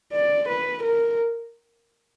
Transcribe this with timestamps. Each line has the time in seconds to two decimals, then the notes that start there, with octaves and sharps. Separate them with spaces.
0.13 D5
0.49 B4
0.84 A#4